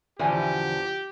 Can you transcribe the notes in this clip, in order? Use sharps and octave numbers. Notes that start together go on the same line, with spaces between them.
E2 B2 D3 F3 G4 G#5